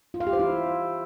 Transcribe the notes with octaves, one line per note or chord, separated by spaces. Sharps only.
F4
F5
G4
C5
E4